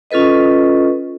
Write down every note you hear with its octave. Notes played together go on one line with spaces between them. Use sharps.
C#4 F4 A4 B4 D#5